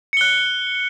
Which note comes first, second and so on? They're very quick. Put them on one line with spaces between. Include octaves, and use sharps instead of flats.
C#7 G7 F#6